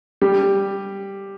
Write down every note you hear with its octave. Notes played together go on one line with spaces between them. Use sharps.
G3